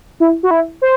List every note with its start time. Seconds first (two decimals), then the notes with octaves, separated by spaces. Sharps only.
0.20 E4
0.43 F#4
0.51 E4
0.82 C5